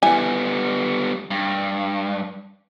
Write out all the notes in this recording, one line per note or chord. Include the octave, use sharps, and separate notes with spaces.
E3 G3 B3 G#5
G2